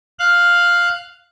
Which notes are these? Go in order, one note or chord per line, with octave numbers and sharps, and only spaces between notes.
F5 F#6